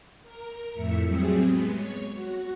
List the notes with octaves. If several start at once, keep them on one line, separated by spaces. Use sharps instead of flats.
A#4
F2 A2 E5 C#7
F#3 G3 C4 G#4
G#3 B3
C#5
F#4